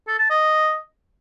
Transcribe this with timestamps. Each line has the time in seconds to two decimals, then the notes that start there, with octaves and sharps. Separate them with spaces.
0.07 A4
0.19 A5
0.30 D#5